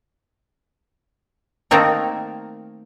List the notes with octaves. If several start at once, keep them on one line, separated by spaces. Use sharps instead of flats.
D#3 A3 A#3 C4 A#4